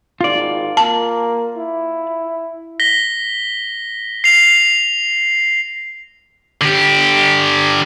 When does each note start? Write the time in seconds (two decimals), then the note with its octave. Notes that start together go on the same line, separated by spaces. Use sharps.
0.21 G#1 F4 D5
0.77 A#3 A5
1.58 E4
2.80 A#6 B6 G7
4.24 C7 F7
6.61 D3 G4